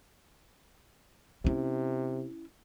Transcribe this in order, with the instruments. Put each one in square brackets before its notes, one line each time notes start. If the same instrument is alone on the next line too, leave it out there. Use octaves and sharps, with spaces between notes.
[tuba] C3 [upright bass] C#4 E4